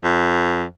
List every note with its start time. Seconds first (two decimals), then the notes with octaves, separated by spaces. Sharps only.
0.04 F2